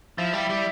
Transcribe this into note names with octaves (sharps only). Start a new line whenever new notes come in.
F3 E4
G3
G3